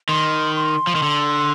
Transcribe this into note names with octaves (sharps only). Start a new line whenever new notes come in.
D#3 C6
C6
F3
D#3
D3